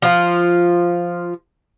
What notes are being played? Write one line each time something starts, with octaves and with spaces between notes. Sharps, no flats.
F3 F4